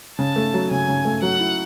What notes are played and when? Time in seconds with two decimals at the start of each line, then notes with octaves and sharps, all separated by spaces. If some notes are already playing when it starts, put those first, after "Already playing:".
0.19 C#3 A5
0.36 A3
0.54 F#3
0.71 C#3 G#5
0.88 C#3
1.05 A3
1.22 F#3 F#5
1.39 E4